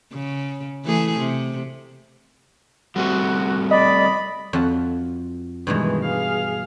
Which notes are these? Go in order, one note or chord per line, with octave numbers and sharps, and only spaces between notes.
C#3
E3 A3 G#4
C3
G3 A3 C4 F#4
D5 D#5 B5
F2 F#4 A5
G2 B2 D#3 E3 G#3
G#4 F5